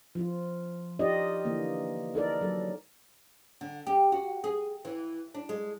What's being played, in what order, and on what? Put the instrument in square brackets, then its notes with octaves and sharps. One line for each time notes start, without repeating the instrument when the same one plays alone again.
[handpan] F3 F4
D#4 F4 G4 D5 D#5
D3 E3 A#3
D#4 A4 A#4 D5
F#3 A4
[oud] D3
G4
F#4
G#4
E3
D4
G#3